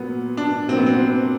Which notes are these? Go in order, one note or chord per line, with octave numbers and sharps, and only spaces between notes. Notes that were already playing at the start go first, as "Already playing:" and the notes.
Already playing: A#2 F#3 B3
D4
A#2 F#3 C4
B3
C4
C4